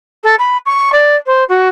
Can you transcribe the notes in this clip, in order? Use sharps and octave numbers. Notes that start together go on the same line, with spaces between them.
A4
B5
C#6
D5
C5
F#4